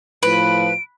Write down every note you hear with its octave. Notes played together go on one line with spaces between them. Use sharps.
A2 F3 F4 B4 D7